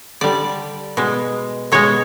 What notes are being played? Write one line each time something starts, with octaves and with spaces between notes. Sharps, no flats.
D3 G3 D5
B2 G#3
B2 G#3 C#5